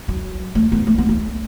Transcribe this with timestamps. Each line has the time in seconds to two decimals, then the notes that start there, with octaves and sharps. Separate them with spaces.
0.08 F#3
0.55 A3
0.72 B3
0.87 A3
0.98 B3
1.09 A3